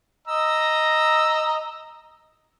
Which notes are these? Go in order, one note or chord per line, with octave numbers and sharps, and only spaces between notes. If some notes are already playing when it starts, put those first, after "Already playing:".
D#5 A#5 E6